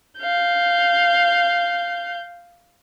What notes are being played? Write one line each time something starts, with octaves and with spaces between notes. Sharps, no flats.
F5 G6